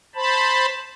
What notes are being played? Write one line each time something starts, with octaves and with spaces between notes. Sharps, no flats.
C5 A5 B5